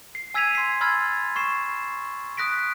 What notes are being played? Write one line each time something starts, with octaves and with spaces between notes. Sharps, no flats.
C7
G#5 E6 G#6 B6 D#7 F7
C6 C7
B5 C6 E6 F6 G#6 A6
C#6 C7 E7
D#6 F#6 A#6 B6 D7